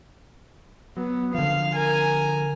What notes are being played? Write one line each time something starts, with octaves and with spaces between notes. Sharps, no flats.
F#3 B3
D3 F3 F5
A#4 G#5